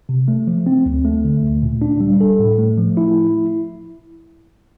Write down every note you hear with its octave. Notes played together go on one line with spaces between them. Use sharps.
C3
A3
F3
C4
D2
A3
D3
D2
A#2
D4
G3
A4
A2
A3
F3
E4